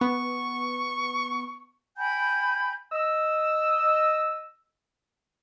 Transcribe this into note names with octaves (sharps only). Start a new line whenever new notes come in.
B3 C#6
G5 G#5 B5 G6
D#5 E6